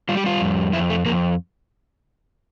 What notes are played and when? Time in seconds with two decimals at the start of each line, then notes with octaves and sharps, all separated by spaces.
0.09 G3 F4
0.17 G4
0.26 F4
0.41 F2
0.73 F2 E4
0.90 A3
1.06 F2 A#3